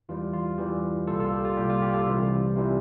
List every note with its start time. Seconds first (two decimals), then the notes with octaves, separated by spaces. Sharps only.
0.09 E2 E3 G3 F4
0.33 F4
0.58 E2 E3 G3 G4
1.07 C2 A#2 G3 F4 A4
1.20 F4 A4
1.32 G4
1.45 F4
1.57 C2 A#2 G3 G4
1.70 F4
1.82 G4
1.94 F4 A4
2.06 C2 C3 E3 G3 G4
2.56 C3 E3 G3 F4